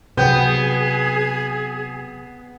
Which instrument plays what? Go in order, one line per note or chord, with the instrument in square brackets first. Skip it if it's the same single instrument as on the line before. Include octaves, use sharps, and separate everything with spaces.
[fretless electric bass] C3 F#3 [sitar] B3 [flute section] G#4 [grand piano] G5 G6